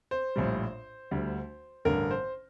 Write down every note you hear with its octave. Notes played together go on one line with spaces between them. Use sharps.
C5
A#1 A2 G3
D2 D3 G3
A1 G2 D3 A#4
C5